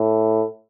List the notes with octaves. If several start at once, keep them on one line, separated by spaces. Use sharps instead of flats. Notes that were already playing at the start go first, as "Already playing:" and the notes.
Already playing: A2